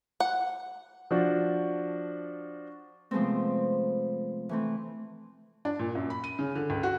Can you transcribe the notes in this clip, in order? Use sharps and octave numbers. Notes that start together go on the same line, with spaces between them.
F#5
F3 D4 F#4
C3 F3 G#3 A3 B3 C4
E3 A3 C4
D4
A#2
F#2
B5
D#7
C#3
D3
C#2
F#4